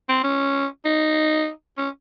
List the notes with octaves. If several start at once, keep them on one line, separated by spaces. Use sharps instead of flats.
C4
C#4
D#4
C#4